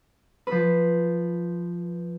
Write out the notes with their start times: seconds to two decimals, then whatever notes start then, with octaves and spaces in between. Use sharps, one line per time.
0.47 F3 B4